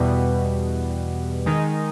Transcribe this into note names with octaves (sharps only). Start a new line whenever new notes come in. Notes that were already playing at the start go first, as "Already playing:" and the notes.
Already playing: E2 B2 G3 B3
D#3 G#3 D#4